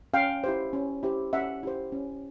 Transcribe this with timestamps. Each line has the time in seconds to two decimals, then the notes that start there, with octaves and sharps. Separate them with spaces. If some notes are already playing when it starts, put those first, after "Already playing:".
0.13 C#4 F5 G5
0.44 E4 G4 C5
0.73 C#4
1.03 E4 G4 C5
1.33 C#4 E5 F#5
1.63 E4 G4 C5
1.92 C#4